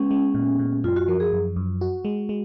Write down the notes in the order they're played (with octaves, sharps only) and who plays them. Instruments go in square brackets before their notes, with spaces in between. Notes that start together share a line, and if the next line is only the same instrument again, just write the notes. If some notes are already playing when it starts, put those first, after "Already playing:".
Already playing: [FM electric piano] G#3 B3 [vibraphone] C#4
[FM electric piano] G#3
A#2
A#2
[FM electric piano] F#2 [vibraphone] F4
[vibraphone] F#4
[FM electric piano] F3 [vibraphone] A#4
[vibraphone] G#4
[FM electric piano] F#2
F#2
F#4
G#3
G#3